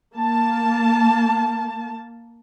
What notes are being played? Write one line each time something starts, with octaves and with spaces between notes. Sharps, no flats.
A#3 A5